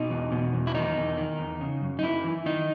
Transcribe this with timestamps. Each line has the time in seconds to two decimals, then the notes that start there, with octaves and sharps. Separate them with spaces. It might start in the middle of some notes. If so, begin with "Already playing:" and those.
Already playing: B2 D#4
0.10 E2
0.32 B2
0.54 E2
0.67 E4
0.74 D#3 D#4
0.97 E2
1.17 D#3
1.39 E2
1.61 C#3
1.82 F#2
1.99 D#4
2.03 F#2 E4
2.24 E3
2.46 D#3 D#4